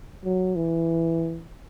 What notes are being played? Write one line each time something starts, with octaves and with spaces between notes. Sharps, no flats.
F#3
E3